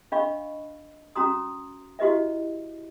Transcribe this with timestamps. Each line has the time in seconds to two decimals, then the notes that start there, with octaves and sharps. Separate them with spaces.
0.12 D4 D#5 F5 B5 C#6
1.16 C#4 F#4 A#5 C6 D#6
1.99 E4 F#4 G4 B4 D#5 E5